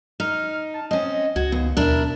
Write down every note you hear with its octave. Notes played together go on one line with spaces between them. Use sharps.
D#4 F6
A5
C4 C#4 D#5
C#2 F#4 G#6
D#2 B3
D#2 B2 D4 E4 A#4